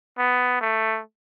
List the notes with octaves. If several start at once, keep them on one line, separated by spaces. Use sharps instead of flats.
B3
A3